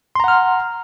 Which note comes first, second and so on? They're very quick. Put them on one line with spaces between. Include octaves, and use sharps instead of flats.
C6 A#5 F#5 F6